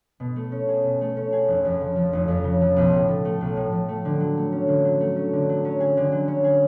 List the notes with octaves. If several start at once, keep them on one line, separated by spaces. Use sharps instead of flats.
B2
A3
C#4
G#4
B2
A3
C#4
G#4
F1
F2
C#3
F3
F1
F2
C#3
F3
B1
A2
F3
A3
B1
A2
F3
A3
D3
F#3
A3
C#4
D3
F#3
A3
C#4
D3
F#3
C#4
G#4
D3
F#3
C#4
G#4